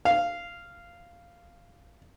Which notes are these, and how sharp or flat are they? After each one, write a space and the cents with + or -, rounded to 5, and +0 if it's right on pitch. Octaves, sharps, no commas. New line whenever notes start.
F5 -10